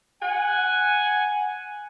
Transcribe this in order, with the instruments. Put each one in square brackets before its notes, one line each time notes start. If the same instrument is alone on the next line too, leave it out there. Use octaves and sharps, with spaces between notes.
[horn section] F#5 G#5